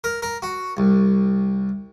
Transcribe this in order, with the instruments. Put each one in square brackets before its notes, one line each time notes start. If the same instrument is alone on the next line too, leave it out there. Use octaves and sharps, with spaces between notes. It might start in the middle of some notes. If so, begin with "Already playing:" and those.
[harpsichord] A#4
A#4
F#4
C2